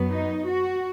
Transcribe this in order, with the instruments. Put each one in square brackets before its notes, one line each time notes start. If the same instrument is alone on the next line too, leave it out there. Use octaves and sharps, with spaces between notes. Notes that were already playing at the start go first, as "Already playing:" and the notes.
Already playing: [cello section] F#2 F#3 B3
D#4
F#4